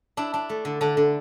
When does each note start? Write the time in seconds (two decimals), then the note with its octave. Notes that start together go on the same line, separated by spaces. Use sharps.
0.17 D4 E4
0.34 D4
0.50 A3
0.65 D3
0.81 D3 D4
0.97 D3